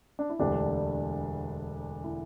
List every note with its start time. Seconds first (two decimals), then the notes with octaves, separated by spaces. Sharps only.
0.19 D4
0.30 E4
0.39 E1 D2 D3 D4 G4
2.04 E4